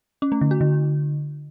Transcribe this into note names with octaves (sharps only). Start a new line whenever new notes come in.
C#4
A3
D3
F#4
D3